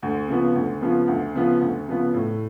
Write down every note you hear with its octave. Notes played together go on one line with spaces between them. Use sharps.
D2
C#3 F3 B3
D2
C#3 F3 B3
D2
C#3 F3 B3
D2
C#3 F3 B3
A2